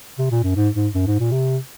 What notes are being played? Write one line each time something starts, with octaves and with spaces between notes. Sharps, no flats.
C3
A#2
F#2
G#2
G#2
F#2
G#2
A#2
C3